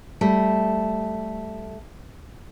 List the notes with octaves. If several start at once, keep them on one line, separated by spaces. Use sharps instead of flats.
G3 A3